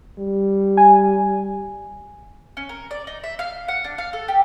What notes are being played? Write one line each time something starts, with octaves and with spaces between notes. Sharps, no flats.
G3
G#5
C#4
A#4
D5
D#4
E5
F5
F#5
D4
F5
A4
G4